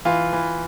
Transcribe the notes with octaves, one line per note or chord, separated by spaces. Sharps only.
E3 F4
E3